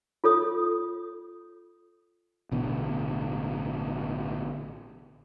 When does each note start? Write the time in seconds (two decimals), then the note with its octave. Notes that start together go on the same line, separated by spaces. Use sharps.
0.24 F4 A4 C#5 D#6
2.52 A1 B2 D3